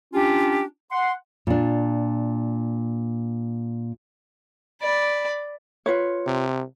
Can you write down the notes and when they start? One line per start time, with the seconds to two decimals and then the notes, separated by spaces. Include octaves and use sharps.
0.14 C#4 D4 F4 G4
0.91 F#5 C6
1.47 A#2 D4
4.82 D5 B5
5.86 F4 B4 C#5
6.26 C3